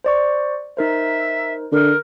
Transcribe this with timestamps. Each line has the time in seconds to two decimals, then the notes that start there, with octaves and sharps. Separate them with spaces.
0.04 C5 D5 C#6
0.77 D#4 A#4 C5 E5
1.72 D3 A#4